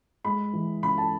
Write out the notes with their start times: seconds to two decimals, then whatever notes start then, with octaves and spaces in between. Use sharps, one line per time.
0.25 G#3 B5
0.53 E3
0.83 C#3 B5
0.98 A5